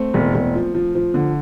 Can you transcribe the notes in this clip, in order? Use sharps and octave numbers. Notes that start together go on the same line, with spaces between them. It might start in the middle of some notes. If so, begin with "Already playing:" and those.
Already playing: A3 C4
E1
E1
F3
F3
F3
D3